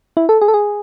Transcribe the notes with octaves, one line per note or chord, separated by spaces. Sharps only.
E4
A4
G#4
A4
G#4